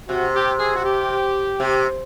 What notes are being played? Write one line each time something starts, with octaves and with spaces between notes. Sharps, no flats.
C3 F#4
G4
G#4
F#4
G4
C3